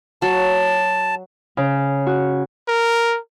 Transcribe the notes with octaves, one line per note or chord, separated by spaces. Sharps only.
F#3 A5
C#3
F#4
A#4